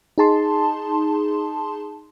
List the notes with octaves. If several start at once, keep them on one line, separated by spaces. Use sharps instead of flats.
D#4 G#4 A5 C6